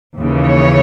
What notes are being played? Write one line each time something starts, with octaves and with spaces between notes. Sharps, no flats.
D#2 C#3 E3
C#5